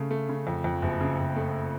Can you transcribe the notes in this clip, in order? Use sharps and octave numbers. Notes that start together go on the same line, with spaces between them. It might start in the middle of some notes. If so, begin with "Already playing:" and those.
Already playing: C#3 A3
A3
C#3
F2
F2
F#1
C#3
F#1
A3